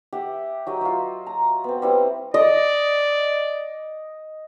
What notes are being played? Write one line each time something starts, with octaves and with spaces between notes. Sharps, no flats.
G4 E5 F#5
F#3 G4 D#5
F#3 F4
A#5
B3 C4
G3 C4 E4
D5 D#5